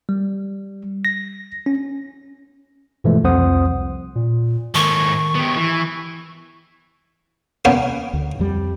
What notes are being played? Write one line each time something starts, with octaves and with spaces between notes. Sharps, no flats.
G3
A#6
C#4
G2 B2 E3 F3 G#3 A3
C2 F2 C3 C5 F#5 D#6
A#2
G#2 D#3 A4 C#6
B3 G4
E3
A#3 B3 C#4
D2
F2 G3